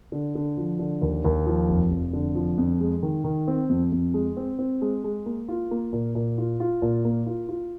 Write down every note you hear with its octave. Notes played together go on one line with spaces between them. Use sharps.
D3
D3
F3
D3
D#2
D#2
F3
F1
F1
D3
F3
F2
G#3
D#3
D#3
C4
F2
F2
G#3
C4
C4
G#3
G#3
A#3
F4
A#3
A#2
A#2
F4
F4
A#2
A#3
F4
F4